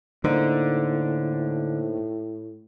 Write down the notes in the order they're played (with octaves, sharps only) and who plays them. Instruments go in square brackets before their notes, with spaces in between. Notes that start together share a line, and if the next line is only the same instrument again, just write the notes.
[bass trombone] A2 [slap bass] D3 [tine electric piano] A#3 D#4 C5